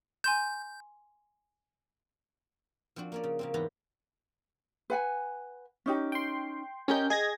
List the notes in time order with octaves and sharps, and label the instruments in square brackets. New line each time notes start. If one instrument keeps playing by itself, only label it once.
[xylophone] G#5 C6 E7 [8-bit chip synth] G6
[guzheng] F3 C4 D4 F#4
A#3 C#4 D5
C#3
C#3 A#3 C4
E2 G#2 B3 G4 B4 A#5
[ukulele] B4 F#5 G#5
C#4 D#4 G4
[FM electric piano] G5 C6
[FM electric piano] C#4 G6 [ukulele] G4 A#4 D#5
[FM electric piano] G#4 G#6 A#6 [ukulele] D#5